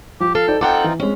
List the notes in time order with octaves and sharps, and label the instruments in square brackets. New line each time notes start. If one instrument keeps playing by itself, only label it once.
[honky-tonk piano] F3 [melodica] G4
[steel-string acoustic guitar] A4 [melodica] F5
[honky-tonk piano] D#4 C5 D5 [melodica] G5
[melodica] C4 D#4 F4 [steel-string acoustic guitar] A4 F#5 G5 [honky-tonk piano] D6
[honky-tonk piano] E3
[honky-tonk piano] G#3 C4 [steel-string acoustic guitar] C#4